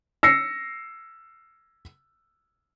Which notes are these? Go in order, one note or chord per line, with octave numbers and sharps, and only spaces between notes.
E6 A#6 C7 C#7